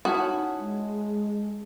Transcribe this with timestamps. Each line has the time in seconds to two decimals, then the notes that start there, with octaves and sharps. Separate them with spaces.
0.05 C#4 D#4 E4 F#4 F#5 A5 D#6
0.59 G#3